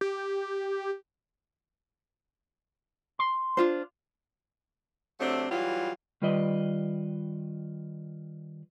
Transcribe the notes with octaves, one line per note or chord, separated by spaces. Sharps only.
G4
C6
D4 F4 C5
C3 F#3 A3 C4 D4
E3 F#3 G3 F4
D#3 G3 F4 B4 D5 D#5